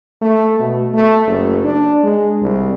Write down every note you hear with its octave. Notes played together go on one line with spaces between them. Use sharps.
A3
B2
A3
F#1
D4
G#3
C2